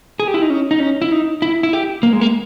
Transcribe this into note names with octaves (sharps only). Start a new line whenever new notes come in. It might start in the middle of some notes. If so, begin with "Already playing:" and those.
G#4
G4
E4
D#4
C#4
D#4
C#4
E4
D#4
E4
E4
G4
A#3
G#3
A#3